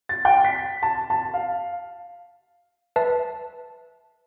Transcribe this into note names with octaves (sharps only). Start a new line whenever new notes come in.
A6
G5
B6
A5
A5
F5
B4 E5 A5